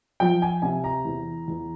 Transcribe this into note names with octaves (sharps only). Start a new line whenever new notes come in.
F3 G5
G#5
C3 G#5
A#5
E2
E2